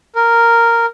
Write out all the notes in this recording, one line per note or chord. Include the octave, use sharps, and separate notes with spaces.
A#4